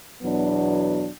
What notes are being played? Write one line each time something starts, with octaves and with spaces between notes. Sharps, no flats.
E2 B2 F#3 B3 D4